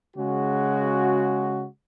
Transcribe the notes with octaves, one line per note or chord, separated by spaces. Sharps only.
C#3 G#3 F#4